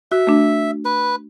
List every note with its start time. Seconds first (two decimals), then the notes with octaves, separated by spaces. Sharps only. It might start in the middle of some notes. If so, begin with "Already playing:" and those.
0.12 F#4 E5
0.27 A3 D4
0.85 B4